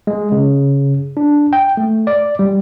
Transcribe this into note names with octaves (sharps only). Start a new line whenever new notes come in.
G#3
C#3
D4
G5
A3
D5
G3